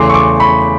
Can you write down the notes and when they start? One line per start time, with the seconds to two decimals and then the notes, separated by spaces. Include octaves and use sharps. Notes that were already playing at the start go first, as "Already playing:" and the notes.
Already playing: E2 C#3 E3 A3 C6 D6
0.10 C#6
0.14 C6 D6
0.40 B5 C#6